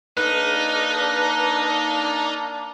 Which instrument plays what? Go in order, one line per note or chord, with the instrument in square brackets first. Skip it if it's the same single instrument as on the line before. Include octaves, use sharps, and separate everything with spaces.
[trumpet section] A#3 D4 [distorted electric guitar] D#4 [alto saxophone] B4